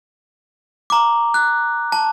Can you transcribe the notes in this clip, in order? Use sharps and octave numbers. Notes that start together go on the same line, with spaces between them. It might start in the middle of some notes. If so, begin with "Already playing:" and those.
A#5 D6
F#6
A5